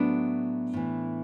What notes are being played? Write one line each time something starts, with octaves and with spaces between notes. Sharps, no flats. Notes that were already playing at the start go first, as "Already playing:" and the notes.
Already playing: A2 F#3 B3 D4
A2 E3